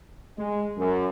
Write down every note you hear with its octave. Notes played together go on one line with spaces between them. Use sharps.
G#3
F#2